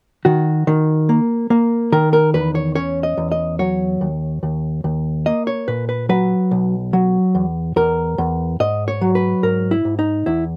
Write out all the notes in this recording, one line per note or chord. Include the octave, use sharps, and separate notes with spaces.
D#3 F#4
D#3
A#3
A#3
D#3 A#4
A#4
E2 B4
C#5
C#4 C#5
D#5
E2
D#5
F#3 C#5
D#2
D#2
D#2
A#3 D#5
C#5
A#2 B4
B4
F#3 B4
B1
F#3
E2
E2 A#4
E2
G#2 D#5
C#5
F#3
B4
G#2 A#4
E4
G#2
D#4
E2 E4